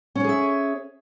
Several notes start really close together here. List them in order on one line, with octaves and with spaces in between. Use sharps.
C#4 C#5 G#4 E5